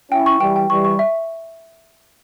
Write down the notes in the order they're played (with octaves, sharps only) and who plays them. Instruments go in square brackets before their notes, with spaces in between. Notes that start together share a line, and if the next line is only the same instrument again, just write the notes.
[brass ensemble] C#4 E4 [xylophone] G5
[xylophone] C#6
[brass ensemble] E3 G3 [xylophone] G5
[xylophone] G5
[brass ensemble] E3 G3 [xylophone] C#6
[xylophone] C#6
E5